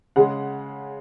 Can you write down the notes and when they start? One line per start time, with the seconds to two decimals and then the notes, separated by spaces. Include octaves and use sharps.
0.16 C#3 G#3 F#5